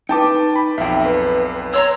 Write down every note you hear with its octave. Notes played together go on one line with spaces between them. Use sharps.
D#4 B4 G5 A5 D6
B5
B1 F2 E5 G5
B4
C#5 A#5 C6 E6